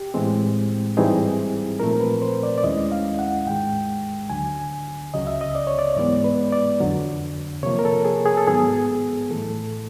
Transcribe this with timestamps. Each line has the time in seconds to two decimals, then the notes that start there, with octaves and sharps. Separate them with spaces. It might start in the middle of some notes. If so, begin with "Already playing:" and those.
Already playing: G4
0.14 A2 E3 G#3 C4
0.97 G#2 E3 G3 C4 D#4 G#4
1.80 A#2 F3 A3 C4 A#4
2.01 B4
2.22 C5
2.43 D5
2.58 D5
2.64 D#2 D#3 G#3 C#4 E4 D#5
2.92 F5
3.19 F#5
3.46 G#2 D#3 G#3 G5
4.30 D2 D3 F#3 G#5
5.14 C#2 C#3 F#3 D#5
5.27 E5
5.41 D#5
5.55 D5
5.67 C#5
5.79 D5
5.96 G#2 E3 G#3 B3 D5
6.24 B4
6.52 D5
6.81 F2 D3 F#3
7.63 C3 F3 A#3 C#5
7.79 A#4
7.85 A4
8.05 G#4
8.25 G#4
8.37 A4
8.48 G#2 D#3 F#3 B3 G#4
9.30 A2 E3 A3 A4